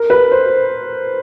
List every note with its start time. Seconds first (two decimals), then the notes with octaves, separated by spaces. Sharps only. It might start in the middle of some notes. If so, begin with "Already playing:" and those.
Already playing: A#4
0.10 B4
0.32 C5